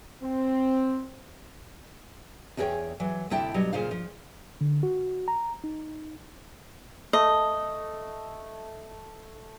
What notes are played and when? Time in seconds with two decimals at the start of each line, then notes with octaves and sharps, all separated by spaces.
0.22 C4
2.57 E2 D4 G#4 A4 C#5 G5
3.00 E3 F#3
3.30 D2 C3 E4 G5 A5
3.54 B2 F#3 G3
3.73 A#2 C#3 F4 C5 F5
3.91 F3
4.61 D3
4.83 F#4
5.28 A#5
5.64 D#4
7.13 A3 D#5